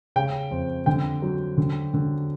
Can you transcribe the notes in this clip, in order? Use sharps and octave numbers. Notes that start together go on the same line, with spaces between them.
C#3 G5
F2
D3 G5
F#3
D3
D3